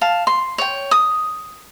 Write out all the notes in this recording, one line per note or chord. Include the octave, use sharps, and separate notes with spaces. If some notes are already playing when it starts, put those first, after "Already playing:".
F5 A5
C6
C#5 G5
D#6